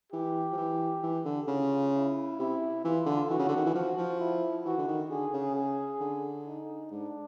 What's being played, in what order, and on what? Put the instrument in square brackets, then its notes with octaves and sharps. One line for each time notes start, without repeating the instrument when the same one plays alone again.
[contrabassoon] E3 [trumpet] G4
[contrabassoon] F3
E3
E3
D3
[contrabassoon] C#3 [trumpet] F4
[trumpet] E4
[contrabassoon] C3 [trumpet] E4
[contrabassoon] E3 [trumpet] F4
[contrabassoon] D3
[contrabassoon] E3 [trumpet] F#4
[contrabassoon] C#3
D3
D#3
E3
[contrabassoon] F3 [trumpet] F#4
[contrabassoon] F3
[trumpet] E4
[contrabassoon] E3 [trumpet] F#4
[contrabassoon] D3
D#3
[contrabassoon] D3 [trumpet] G#4
[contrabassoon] C#3
[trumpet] G#4
[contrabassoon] D3
[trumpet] D#4
[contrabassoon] G#2 [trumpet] D4